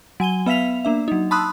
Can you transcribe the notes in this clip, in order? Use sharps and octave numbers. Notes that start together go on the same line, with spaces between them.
F#3 G#5 D#7 G7
B3 E5 F5 B6 F7
A#3 D4 E5
F#3 D#4
A5 B5 C6 D#6 E6 F#6